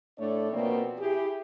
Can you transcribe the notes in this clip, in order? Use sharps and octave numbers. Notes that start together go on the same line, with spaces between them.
A2 A3 D4 C#5 D5
B2 F3 A#3 C4 D5
E4 G4 G#4